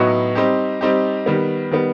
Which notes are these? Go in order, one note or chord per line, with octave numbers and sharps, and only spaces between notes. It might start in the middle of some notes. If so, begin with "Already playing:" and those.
Already playing: A2 F#3 B3 D#4 F#4
G3 C4 D#4 G4
G3 C4 D#4 G4
D#3 G3 B3
D#3 G3 B3